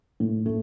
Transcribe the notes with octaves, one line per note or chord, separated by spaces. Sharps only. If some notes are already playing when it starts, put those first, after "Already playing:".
A2
A3